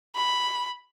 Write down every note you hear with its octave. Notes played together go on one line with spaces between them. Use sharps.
B5